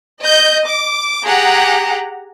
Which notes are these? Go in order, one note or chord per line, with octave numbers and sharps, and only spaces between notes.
D#5 G6
D6
G4 G#4 F#5 A#5